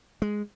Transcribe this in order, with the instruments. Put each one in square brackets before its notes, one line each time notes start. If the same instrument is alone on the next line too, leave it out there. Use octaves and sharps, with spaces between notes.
[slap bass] G#3